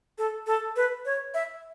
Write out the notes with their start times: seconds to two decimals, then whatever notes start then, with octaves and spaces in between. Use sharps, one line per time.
0.18 A4
0.47 A4
0.76 B4
1.05 C#5
1.34 E5